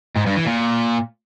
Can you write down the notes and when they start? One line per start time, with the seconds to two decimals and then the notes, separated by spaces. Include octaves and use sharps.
0.16 G#2
0.26 G2
0.36 E3
0.46 A#2